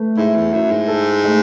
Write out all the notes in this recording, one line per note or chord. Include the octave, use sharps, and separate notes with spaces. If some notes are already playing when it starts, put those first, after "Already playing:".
Already playing: A3 B4
G#2 E4
E2
F#2 E4
G#2
A4
A3